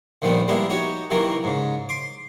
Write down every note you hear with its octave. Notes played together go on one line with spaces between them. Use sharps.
D2 A#2 D#3 F3 G3 B3
G3 G#3 A#3 B3 E4
D#4 F#4 G4 C#5
C3 D#3 E3 F#3 A#3 A#4
G#2 C#3
C6 D6